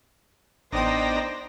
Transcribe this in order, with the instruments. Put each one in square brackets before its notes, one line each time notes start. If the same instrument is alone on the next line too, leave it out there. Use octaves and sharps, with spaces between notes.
[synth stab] A1 B3 D#6 [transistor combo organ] D4 D#4 A#5 [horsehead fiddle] C5 G5